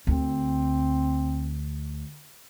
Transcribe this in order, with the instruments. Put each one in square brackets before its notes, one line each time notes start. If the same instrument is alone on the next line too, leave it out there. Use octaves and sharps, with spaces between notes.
[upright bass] D2 [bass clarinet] C4